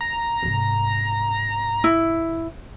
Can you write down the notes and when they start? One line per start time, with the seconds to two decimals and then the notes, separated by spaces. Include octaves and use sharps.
0.01 A#5
0.43 G#2 C3
1.84 E4